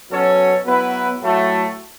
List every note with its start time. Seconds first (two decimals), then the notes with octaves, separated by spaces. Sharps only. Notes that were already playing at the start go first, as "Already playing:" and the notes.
0.11 B2 F#3 C#4 A4 C#5
0.65 F#3 B3 E4 B4
1.21 A2 F#3 A3 F#4